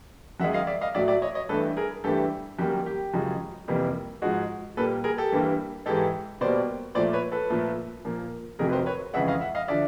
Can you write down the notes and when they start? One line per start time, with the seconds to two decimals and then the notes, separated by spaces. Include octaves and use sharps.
0.40 F#2 D#3 G#3 E5 F#5
0.53 D#5 F5
0.67 D5 E5
0.81 D#5 F5
0.94 A2 F#3 A3 D5 E5
1.08 D5 E5
1.22 C#5 D#5
1.35 C#5 D#5
1.49 G2 E3 A3 A4 B4
1.77 G#4 A#4
2.04 G2 E3 A3 G4 A4
2.59 F#2 D#3 G3 A#3 G4
2.86 G4
3.13 F#2 C#3 F3 G#3
3.68 F2 C3 E3 G3 A#3
4.22 G#2 F3 G#3 F#4
4.77 A#2 G3 A#3 A4 B4
5.04 G#4 A#4
5.18 G4 A4
5.32 G2 E3 G3 A#3
5.86 G#2 E3 G#3 G4 A4
6.41 B2 G3 A#3 C5 D5
6.95 A#2 F3 A3 C5 D5
7.13 B4 C#5
7.32 A4 B4
7.50 A#2 F3 A3
8.05 A#2 F3 A#3
8.59 F2 C3 D#3 F#3 A3 G#4 A#4
8.69 B4
8.73 A#4 C5
8.86 B4 C#5
9.14 F2 C#3 E3 G#3 E5 F#5
9.28 D#5 F5
9.41 E5 F#5
9.55 D#5 F5
9.68 D3 F3 D5 E5